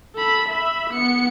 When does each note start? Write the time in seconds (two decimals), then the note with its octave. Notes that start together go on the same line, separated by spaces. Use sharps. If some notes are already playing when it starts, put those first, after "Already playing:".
0.16 A4 B5
0.49 E5 B5
0.90 B3 C#7